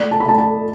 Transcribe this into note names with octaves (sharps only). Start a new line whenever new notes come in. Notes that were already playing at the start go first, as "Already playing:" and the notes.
Already playing: A3 D5
A5
B5
A3 A5
A5